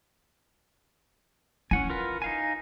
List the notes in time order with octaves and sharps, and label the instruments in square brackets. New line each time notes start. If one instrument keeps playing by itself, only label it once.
[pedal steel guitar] C#4 F#5 G#5 [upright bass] E4
[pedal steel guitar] F4 A#4 B4
D#4 F5 G#5